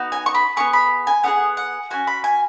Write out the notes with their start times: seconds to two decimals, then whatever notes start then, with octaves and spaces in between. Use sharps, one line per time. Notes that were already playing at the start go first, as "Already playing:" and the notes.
Already playing: B3 D#4 F#4
0.12 G#5
0.26 C#6
0.35 B5
0.56 B3 D#4 G#4 C#6
0.73 B5
1.07 G#5
1.24 B3 D#4 G#4 F#5
1.57 F#5
1.91 C#4 F#4 G#5
2.07 B5
2.24 G#5